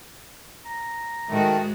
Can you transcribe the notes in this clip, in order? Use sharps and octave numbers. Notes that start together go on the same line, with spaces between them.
A#5
G#2 D#3 A3 F#4